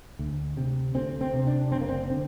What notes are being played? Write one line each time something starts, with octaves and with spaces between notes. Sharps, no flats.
D2
C3
D2 C4
C4
C3
D4
F#1 C4
A#3
C4
D3 C4